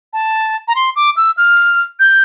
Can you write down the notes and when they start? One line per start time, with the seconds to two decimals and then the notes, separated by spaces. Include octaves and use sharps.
0.13 A5
0.68 A#5
0.76 C6
0.96 D6
1.17 E6
1.37 F6
2.00 G6